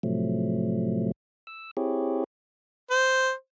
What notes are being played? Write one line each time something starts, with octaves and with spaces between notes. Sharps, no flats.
A2 C3 F3 F#3 A3
E6
C4 E4 G4 G#4 C#5
C5